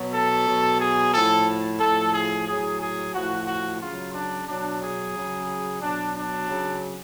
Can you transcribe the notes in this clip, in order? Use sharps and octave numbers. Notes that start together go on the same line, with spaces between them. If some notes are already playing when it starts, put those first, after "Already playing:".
Already playing: B2 F#3
A4
B2 F#3
G#4
A2 F3 A4
A2 F3 A4
G#4
A2 F#3 G#4
G#4
A2 F3 F#4
F#4
C#3 F#3 F4
D4
B2 F#3 D4
G#4
C#3 F#3
B2 F#3 D4
D4
C#3 F#3